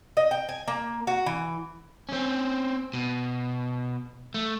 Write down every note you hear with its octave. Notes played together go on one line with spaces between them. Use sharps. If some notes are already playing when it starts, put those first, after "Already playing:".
D#5
G5
G#5
A#3
F#4
E3
C4 C#4
B2
A3